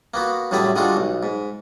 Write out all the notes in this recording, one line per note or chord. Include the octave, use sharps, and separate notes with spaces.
A#3 B3 F#4
F#2 A2 G3 A3 G#4 E5
D3 G3 G#3 F4 F#4 A4
B1
G#2